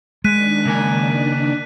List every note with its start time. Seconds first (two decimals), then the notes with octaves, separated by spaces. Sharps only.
0.24 D#3 G#3 D4 F#6 B6 D#7
0.65 C#3 A#3 G#5